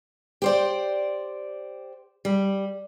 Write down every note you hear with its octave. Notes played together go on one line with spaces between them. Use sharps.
G4 C5 D5
G3